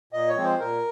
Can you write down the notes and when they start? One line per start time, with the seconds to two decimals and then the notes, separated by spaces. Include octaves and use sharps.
0.13 A#2 D#5
0.28 C#5
0.36 F3 G#3 C4
0.44 C5
0.59 A#2 A#4